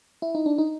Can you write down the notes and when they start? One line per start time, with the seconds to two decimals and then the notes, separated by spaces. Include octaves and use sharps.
0.22 E4
0.35 D#4
0.46 D4
0.58 D#4